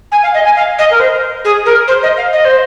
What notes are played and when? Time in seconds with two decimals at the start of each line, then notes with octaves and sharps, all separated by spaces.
0.12 G#5
0.23 F5
0.34 D#5
0.44 G#5
0.56 F5
0.78 D#5
0.91 A#4
1.00 C5
1.44 G#4
1.66 A#4
1.87 C5
2.03 D#5
2.17 F5
2.33 D#5
2.44 C5